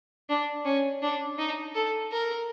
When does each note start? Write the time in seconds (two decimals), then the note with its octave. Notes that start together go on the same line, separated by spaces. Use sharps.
0.29 D4
0.65 C#4
1.02 D4
1.39 D#4
1.75 A4
2.12 A#4